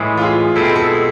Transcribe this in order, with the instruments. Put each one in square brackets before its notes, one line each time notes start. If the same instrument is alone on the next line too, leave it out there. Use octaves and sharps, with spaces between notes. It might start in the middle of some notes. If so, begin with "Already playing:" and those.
Already playing: [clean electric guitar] A2 E3 G#3
[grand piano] F4
G#4
[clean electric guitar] B2 G#3 C4 E4 [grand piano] A4
[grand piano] G#4
A4